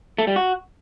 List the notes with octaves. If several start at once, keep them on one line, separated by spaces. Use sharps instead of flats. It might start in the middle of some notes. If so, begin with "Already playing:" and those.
A3
G3
F#4